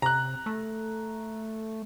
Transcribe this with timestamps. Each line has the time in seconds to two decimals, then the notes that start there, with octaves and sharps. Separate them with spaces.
0.02 C3 A#5 F#6
0.46 A3